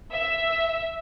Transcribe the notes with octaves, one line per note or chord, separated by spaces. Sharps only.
E5